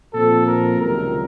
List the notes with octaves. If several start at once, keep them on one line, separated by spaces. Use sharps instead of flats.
A#2 F3 C4 A4
A#4
C#2 C3 D#3 F#3 A#4